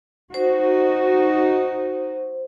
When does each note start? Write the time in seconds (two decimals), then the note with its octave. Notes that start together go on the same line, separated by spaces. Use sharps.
0.34 D#4 F#4 C5